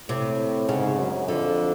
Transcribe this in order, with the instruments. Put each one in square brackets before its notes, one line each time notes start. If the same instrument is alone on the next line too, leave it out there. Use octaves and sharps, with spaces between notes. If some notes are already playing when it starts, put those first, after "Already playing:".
[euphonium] A2 [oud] C3
[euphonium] G#2 [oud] C#3
[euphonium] F#2
[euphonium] F2 [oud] D3